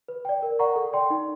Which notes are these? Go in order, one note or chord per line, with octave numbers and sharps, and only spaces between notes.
B4
D5 G5
A#4
D5 F#5 A#5 C#6
A4
D5 G5 C6
D#4